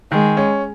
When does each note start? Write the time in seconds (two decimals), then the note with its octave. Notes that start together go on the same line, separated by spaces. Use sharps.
0.12 D#3 G#3
0.37 C#4